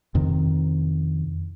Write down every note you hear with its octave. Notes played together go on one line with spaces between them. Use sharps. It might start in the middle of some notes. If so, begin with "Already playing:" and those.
F2 C3 D#3